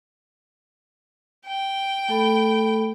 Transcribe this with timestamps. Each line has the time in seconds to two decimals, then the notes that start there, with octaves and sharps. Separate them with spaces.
1.46 G5
2.09 A3 A4 B5